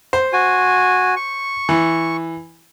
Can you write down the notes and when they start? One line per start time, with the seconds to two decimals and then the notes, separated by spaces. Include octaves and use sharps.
0.13 C5
0.33 F#4 G#5
1.16 C#6
1.69 E3